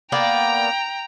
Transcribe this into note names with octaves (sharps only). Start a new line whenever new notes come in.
A#3 B3 D5 G5 A#5